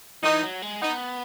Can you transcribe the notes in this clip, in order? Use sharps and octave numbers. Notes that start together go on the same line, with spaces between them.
E3 D#4
F#3
G#3
B3 D#4